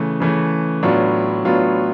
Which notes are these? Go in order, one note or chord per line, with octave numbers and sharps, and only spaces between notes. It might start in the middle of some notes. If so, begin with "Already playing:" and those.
Already playing: C#3 E3 A3
C#3 E3 A3
A2 F#3 B3 D4 F4
A2 F#3 B3 D4 F4